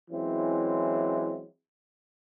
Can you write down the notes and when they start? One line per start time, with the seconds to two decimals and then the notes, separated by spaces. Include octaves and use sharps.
0.11 E3 F#3 G#3 C4 C#4 E4